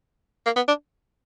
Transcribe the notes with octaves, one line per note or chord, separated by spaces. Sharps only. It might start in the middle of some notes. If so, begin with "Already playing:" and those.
A#3
B3
D4